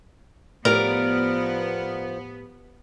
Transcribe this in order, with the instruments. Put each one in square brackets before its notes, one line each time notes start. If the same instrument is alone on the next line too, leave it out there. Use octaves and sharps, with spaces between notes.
[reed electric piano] A2 G4 [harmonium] F3 [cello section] B3 [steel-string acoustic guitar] A#4 D5 F5